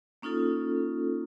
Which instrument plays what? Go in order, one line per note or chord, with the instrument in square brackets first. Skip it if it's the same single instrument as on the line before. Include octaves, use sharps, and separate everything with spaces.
[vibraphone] A#3 C#4 D#4 F4 A4